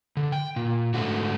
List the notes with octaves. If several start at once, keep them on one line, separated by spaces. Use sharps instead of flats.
D3
G5
A#2
G#2 D3 A3 F#4